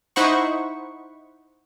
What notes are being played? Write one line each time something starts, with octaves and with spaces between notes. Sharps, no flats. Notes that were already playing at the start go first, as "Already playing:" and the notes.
D#4 E4 C5 F#5 B5 C#6